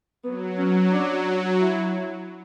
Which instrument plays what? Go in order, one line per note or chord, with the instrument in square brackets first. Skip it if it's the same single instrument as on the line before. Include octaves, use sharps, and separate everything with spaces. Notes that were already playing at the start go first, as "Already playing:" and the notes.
[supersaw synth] F#3 [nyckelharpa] B3
[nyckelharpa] C#4
D4
E4